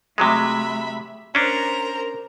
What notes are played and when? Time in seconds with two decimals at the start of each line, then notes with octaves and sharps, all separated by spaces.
0.18 C3 F#3 G#3 A3 E5 B5
1.35 C#4 D4 A#4 C5 A#5